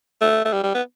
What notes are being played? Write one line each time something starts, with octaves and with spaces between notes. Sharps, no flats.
A3
A3
G3
G3
B3